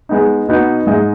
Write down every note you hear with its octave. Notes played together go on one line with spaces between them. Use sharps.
G#3 B3 D#4
B2 B3 D#4
G#2 G#3 D#4 G#4 D#5